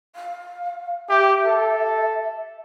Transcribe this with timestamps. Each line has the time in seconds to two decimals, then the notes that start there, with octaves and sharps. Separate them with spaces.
0.15 F5
1.09 G4 E5
1.46 A4